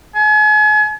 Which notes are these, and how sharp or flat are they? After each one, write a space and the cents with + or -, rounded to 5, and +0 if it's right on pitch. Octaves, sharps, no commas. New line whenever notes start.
G#5 +40